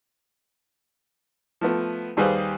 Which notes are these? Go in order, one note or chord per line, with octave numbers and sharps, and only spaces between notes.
F3 A3 B3
D#2 G3 G#4 B4 C5 F5